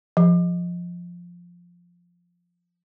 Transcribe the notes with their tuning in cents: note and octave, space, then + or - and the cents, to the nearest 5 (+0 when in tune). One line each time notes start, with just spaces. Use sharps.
F3 +5